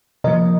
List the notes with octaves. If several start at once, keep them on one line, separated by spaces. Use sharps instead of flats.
C3 F3 A#3 A#4 D#5